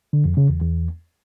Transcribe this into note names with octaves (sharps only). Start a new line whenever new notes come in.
D3
F2
C#3
E2
E2